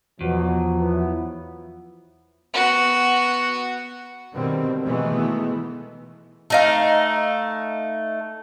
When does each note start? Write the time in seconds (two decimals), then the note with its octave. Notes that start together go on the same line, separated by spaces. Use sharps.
0.21 E2 B2 F3 F#3
0.80 B3 E4
2.54 B3 F#4
4.33 B2 D3 D#3 G3 C4
4.84 B2 D#3 E3 G#3 A3 B3
6.50 A3 D#4 F5